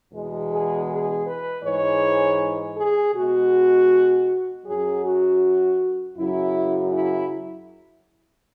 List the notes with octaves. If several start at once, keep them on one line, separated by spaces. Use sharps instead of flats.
E2 B2 G#3
G#4
G#4
B4
G#2 E3 G#3 C#5
G#4
B2 G#3 F#4
F#2 F#3 G#4
F#4
F#2 C#3 F#3 E4
E4